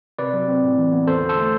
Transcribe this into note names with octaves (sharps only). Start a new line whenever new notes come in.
C3 B4 D5
F#3
C4
A2
E3
B3
E2 A4 C5
D3
A4 C5
A3